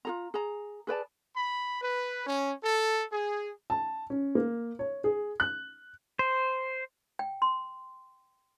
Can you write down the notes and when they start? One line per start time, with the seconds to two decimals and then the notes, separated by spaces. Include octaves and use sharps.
0.05 F4 G#4 A#5
0.34 G#4 A#5
0.87 G#4 B4 D5 A5
1.36 B5
1.81 B4
2.26 C#4
2.62 A4
3.12 G#4
3.70 A5
4.10 C#4
4.35 A#3
4.79 C#5
5.04 G#4
5.40 F#6
6.19 C5
7.19 G5
7.42 C6